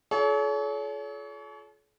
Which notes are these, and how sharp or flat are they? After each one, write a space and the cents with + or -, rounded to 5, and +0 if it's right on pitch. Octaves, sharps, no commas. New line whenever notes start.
F4 +5 A4 -45 C#5 +35